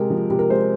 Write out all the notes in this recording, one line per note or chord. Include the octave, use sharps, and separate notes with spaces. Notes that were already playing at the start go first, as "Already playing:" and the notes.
Already playing: C3 G#3 A#4
F3
C3
A#4
G#3 C5